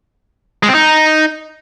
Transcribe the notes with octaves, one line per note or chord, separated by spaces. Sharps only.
G#3
C4
D#4